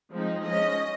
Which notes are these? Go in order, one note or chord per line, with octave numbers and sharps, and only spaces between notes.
F3 G#3 C4 D#4
F3 G#3 C#4 D#5